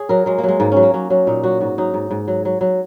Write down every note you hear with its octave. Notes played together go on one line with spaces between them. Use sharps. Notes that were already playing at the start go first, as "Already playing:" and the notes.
Already playing: G#4 C#5
F#3 A#4
F#3 G#3
A#3
F#3 G#3
G#2 A#3
F#3 C#4
A#3
F#3 C#4
F#3 C#4
A#2 D#4
F#3 F#4
G#2 F#4
F#3 D#4
G#2
G#2
F#3
F#3
F#3